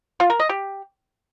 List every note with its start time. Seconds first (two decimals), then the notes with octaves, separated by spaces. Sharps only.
0.20 F4
0.30 A#4
0.40 D#5
0.49 G4